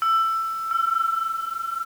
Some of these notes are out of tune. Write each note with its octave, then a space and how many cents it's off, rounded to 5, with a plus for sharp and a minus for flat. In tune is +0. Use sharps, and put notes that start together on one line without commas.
E6 +15
E6 +45